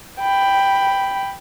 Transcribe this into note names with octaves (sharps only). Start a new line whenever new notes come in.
G5 B5